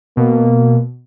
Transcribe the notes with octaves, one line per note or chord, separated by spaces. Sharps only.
B2 A#3